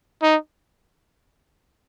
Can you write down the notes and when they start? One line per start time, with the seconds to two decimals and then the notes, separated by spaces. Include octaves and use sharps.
0.22 D#4